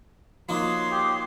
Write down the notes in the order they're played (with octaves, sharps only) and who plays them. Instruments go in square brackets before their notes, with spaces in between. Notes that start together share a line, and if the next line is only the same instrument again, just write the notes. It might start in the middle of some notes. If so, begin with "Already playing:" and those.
[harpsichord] F3 A#3 D#4 [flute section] F#4 C#5 D#6 [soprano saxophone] C6
[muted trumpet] G4